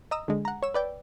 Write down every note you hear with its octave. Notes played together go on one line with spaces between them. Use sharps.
D#5 A#5 D#6 E6
D3 G#3
F#5 A#5
C#5 E6
B4 D5 G5